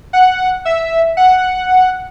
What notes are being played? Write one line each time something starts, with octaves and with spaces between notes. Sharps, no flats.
F#5
E5
F#5